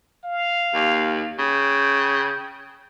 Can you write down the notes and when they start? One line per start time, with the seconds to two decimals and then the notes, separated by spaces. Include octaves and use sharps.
0.24 F5
0.74 D#2
1.39 C#3 G5